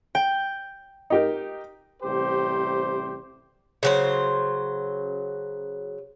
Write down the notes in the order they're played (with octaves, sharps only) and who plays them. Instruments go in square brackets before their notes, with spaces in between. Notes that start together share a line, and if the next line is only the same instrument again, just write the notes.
[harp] G5
[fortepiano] D#4 G4 A#4
[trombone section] A1 C3 G3 G4 C5
[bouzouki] C#3 F#3 C5